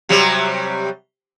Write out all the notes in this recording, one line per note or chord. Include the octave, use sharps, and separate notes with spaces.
C3 F#3 G3